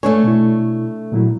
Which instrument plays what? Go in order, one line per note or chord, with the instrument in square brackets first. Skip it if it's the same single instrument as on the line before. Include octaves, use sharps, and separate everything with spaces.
[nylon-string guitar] A3 D4 C#5 [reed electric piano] G#5
[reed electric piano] B2 E4
A#2 F#3 E4